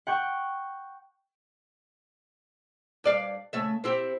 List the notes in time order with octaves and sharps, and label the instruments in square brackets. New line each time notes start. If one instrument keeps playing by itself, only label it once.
[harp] F#5 G5 C#6
[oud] G2 D5 F5
C#3 A3 E5
C4 E4 G4